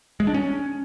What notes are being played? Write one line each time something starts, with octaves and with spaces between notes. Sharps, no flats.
G#3
D4
C#4